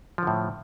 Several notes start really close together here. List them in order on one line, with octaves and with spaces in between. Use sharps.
F3 D3 A2